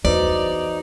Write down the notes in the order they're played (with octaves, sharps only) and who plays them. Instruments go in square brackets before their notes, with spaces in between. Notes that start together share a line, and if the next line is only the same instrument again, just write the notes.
[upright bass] E2 [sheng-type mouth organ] D#4 [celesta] F#4 B4 C5 [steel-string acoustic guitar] D5